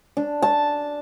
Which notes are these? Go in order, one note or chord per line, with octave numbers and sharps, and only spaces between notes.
D4
A5